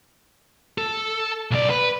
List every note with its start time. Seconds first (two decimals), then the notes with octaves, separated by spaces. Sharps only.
0.78 A4
1.51 B1 D5
1.70 B4